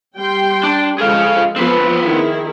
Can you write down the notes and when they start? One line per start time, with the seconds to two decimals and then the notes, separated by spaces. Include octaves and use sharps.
0.17 G3 G5 C6
0.63 D4
0.98 F3 G#3 G#4 A4 F5
1.56 F3 B3 C4 B4
2.04 D#3 E4 G#4